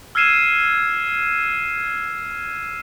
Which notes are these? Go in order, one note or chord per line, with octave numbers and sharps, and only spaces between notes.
E6 F6 G#6 C7 D#7 E7